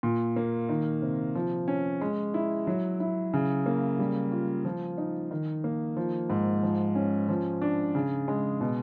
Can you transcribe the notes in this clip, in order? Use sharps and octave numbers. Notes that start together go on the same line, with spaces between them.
A#2
A#3
D#3
C3
F3
C#4
G#3
E4
F#3
E4
C#3
A#3
G3
F4
F3
D#4
D#3
A#3
F3
G#2
F3
C#4
F3
D4
C#3
G#3
B2